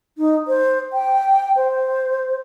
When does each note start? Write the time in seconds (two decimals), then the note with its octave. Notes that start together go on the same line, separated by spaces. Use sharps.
0.18 D#4
0.48 C5
0.93 G5
1.56 C5